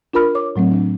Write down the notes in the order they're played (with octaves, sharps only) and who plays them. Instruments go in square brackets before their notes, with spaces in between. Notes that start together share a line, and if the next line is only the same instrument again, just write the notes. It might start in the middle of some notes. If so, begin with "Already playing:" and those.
[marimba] D4 F4 A#4 B5 F6
C#5 D6
A2 F#3 A3 C4
D4